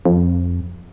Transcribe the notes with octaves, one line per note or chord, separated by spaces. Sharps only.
F2